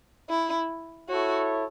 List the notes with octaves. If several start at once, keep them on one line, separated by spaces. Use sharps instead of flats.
E4
E4 F#4 A4 C#5